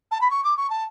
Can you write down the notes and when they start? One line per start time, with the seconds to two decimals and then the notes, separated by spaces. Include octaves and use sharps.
0.11 A5
0.21 B5
0.30 C#6
0.43 D6
0.56 C#6
0.70 A5